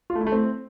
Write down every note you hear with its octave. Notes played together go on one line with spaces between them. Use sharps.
F4
A3
E4
A3
C4